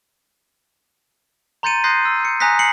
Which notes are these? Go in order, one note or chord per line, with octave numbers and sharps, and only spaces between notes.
A#5 C6 G6 A6 C#7 D#7
C6 D#6 F#6 G6 A#6 C7
E6
C#7
G#5 A#5 D#6 F#6 A#6 B6
C7 C#7 F#7